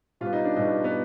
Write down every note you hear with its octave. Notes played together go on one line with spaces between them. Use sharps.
B2 G3 B3 F4
D#4
D4
B2 G3 B3 D#4
B3